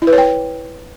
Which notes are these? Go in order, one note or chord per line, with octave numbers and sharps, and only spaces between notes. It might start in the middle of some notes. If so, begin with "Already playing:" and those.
E4
B4
C#5
G5